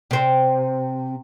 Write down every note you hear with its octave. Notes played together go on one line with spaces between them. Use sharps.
C3 C4